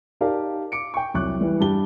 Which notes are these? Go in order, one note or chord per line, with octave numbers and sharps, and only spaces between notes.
D#4 G4 A#4 D5 F5 A5
D6 C#7 D7
G5 C#6
C2 F#3 C#6 D6 F#6
E3 G3
G2 G4 A5 G7